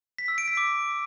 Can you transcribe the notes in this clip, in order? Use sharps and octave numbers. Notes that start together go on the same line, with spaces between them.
B6
E6
D7
B6
D6